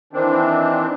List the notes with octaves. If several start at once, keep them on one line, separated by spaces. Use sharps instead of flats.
D#3 E3 C4 D4